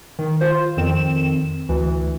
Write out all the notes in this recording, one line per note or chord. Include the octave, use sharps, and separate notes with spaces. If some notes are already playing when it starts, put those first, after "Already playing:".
D#3
F4 C5
F2 D#3 C4 E7
D2 E3